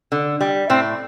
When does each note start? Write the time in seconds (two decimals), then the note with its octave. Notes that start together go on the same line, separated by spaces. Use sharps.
0.12 D3
0.41 G3
0.70 A2 C4